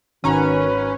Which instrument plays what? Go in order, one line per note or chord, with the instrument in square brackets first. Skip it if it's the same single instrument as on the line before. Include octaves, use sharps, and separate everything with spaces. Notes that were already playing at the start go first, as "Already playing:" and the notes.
[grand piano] G#1 A#5 [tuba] D#3 [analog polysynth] C#4 [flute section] F#4 B4